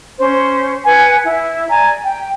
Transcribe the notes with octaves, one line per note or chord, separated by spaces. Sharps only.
C#4 C5
B4 F#5 G#5
E4
D5 G#5 A#5
G5